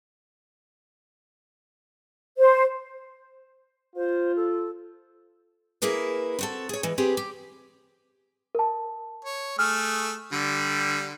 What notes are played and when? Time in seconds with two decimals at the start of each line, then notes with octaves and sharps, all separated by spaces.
2.37 C5
3.96 F4 C5
4.36 A4
5.82 A#3 E4 G#4 A#4 B4
6.39 C4 F#4 A4
6.69 G#4 C#5
6.83 E3 G#3
6.98 C4 G4 G#4 B4
7.17 G4
8.55 A#4 A5
9.25 C#5
9.59 A3 G#4 F6
10.32 D3 G3